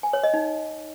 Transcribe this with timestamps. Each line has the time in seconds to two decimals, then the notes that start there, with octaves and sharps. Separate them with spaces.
0.03 G#5
0.13 C#5
0.24 D#5
0.34 D#4